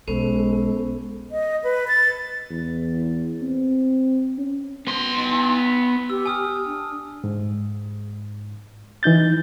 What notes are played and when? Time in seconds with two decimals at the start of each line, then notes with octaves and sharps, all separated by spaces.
0.08 B1 G#3 B3 C#4 A4 C5
1.31 D#5
1.64 B4
1.88 A6
2.50 E2
3.42 C4
4.38 C#4
4.87 B3 C6
6.10 G4 E6
6.26 G#5 D#6 F6
6.66 D4
7.24 G#2
9.03 E3 D#4 G6 A6